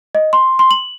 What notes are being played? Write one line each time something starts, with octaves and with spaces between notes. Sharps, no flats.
D#5
C6
C6
F#7